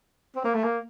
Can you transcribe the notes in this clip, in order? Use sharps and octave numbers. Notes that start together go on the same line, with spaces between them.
C4
A#3
A3
A#3